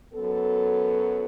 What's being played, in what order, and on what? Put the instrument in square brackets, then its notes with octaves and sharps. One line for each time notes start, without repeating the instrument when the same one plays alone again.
[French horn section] F#2 F#3 B3 A4